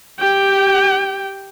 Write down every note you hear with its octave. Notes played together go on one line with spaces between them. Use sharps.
G4 G5